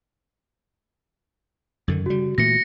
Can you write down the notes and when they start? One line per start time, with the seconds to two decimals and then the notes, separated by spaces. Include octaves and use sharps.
1.88 F#2 D3 D#3
2.06 C#3 G3 F#4
2.38 A#2 E3 A3 A#6 C#7